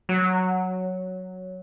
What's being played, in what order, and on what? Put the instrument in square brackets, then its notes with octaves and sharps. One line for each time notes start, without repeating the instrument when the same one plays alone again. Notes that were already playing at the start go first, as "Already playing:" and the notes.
[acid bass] F#3